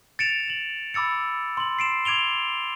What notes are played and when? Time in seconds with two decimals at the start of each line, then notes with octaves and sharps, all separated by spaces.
0.19 A6 C#7 D7 E7 F7
0.48 E7 F#7
0.94 B5 D6 E6 A6 C#7
1.57 C6 F#7
1.79 C7 D7 E7
2.05 D6 G#6 D7 F7 G7